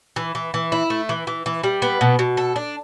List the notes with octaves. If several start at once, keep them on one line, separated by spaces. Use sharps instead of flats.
E3
E3
E3
E4
A3
E3
E3
E3
G3
B3
B2
B2
A4
D4